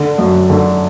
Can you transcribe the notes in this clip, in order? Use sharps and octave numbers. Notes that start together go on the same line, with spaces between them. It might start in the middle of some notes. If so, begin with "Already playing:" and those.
Already playing: D3
F#2
D3